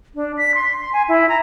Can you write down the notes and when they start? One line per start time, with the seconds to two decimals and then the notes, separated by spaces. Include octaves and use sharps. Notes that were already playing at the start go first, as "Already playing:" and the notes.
0.15 D4
0.38 B6
0.55 C6
0.80 C6
0.93 G#5
1.09 E4
1.29 A#5